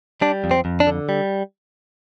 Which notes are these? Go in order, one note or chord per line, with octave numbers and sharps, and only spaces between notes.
G3 D4
F2
C4
F2
D4
D3
G3